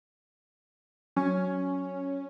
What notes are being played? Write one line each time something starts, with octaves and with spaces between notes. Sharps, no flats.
F#3 C#4